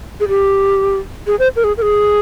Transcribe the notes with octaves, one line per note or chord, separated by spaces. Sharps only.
G#4
G4
G#4
C5
A#4
G#4
A#4
G#4